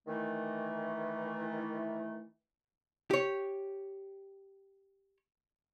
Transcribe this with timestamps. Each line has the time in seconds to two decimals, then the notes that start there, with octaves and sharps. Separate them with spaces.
0.07 D#3 E3 A3
3.11 G4 C#5